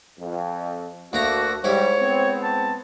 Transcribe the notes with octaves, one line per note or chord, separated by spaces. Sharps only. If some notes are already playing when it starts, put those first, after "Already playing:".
F2
D2 A3 A#3 F#4 A#5
G#2 G3 E4 C#5
B3 C4
A5